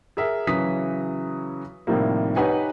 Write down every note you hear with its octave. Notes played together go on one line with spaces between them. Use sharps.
G#4 A#4 E5
C#3 E3 F#3 D#6 B6
A2 C3 D#3 F3 G3 A#3
D#4 G4 B4 C#5 F#5 G#5